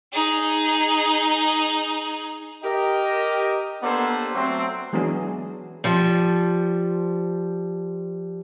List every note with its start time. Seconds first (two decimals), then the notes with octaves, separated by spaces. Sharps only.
0.13 D#4 G#4
2.63 G4 A#4 D#5
3.82 A#3 B3 D4 G4 A4 C5
4.34 F#3 A3 C4
4.93 E3 F#3 G#3 B3 D4 G#4
5.84 F3 G3